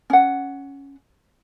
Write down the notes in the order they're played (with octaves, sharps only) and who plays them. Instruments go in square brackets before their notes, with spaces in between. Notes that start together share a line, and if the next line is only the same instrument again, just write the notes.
[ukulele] C#4 F#5